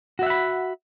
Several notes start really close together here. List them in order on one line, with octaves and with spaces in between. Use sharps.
F#4 E5 F#5 B5